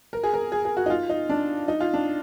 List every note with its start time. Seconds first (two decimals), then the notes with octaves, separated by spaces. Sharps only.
0.13 A#4
0.23 G#4
0.34 A#4
0.52 G#4
0.65 G#4
0.77 F#4
0.86 D#4
0.90 F4
1.09 D#4
1.29 D4
1.68 D#4
1.80 F4
1.93 D4